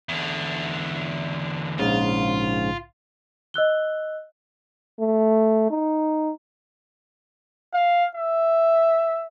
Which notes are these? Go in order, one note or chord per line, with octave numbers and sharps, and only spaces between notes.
E2 D3
A#1 G#2 C#3 F4
D#5 E6 F#6 G7
A3
D#4
F5
E5